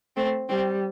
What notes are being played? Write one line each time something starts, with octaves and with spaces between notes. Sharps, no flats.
A3 C4
G3 C4